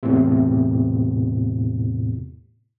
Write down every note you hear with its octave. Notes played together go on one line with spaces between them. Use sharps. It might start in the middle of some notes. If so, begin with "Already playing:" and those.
E2 A2 C3